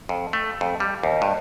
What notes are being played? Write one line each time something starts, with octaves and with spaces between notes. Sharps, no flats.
F2
A3
F2
G3
D#2
G2